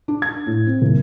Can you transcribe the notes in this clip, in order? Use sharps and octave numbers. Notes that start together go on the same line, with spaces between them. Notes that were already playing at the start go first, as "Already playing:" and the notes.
D4
G#6
A2
C4
F#1